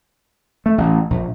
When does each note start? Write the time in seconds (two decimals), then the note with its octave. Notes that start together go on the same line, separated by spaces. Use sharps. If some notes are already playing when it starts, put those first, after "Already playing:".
0.66 A3
0.78 A1
1.10 A#1